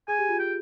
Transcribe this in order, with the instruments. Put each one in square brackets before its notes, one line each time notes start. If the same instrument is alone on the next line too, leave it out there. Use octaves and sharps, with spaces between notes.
[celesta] G#4 [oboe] G#5
[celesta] G4
F4
[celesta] G4 [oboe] G5